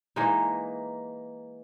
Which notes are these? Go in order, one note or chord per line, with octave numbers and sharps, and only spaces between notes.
E3 G#3 A#3 D#4